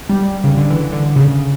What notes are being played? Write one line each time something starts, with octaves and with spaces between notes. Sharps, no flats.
G3
C#3
D3
E3
D3
C#3